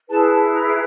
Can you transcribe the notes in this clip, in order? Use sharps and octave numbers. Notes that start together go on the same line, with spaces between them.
E4 G#4 B4 A5
A5
A#5